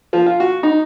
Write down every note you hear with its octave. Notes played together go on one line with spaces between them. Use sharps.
F3
F4
F#4
D#4